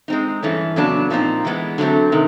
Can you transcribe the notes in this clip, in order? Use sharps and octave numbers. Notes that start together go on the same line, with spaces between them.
G#3 C4 D#4
G2 E3 A3 C#4
F2 C#3 F#3 B3 D4
A#2 F3 G#3 C4 D#4
E3 G#3 B3
D3 F#3 A3 C4
C3 D#3